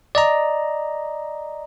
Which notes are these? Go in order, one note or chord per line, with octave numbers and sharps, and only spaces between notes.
D5 D#5 A#5